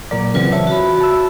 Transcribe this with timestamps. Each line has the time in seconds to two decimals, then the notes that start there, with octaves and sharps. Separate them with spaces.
0.11 A#2 F#3 A#4 D5
0.34 C#3 E3 F#3 C4 F4 B4
0.52 C#5 E5 A5
0.67 F#4 B5
1.01 A5 E6